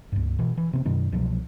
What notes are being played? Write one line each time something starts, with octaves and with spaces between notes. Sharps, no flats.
C#2 G2
B2 E3
E3
C3 B3
F#2 B2 D#3
C2 B2 F3 F#3